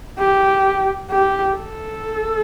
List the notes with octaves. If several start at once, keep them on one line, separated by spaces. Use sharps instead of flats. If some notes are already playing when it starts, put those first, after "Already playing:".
G4
G4
A4